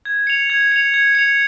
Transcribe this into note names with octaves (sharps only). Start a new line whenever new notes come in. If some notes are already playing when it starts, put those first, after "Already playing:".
G#6
C#7 F7
G#6
C#7 F7
G#6
C#7 F7